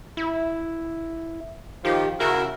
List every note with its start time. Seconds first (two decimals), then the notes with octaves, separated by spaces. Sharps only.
0.17 E4
1.85 D#3 F3 G4
2.20 C#3 E4 F#4 A#4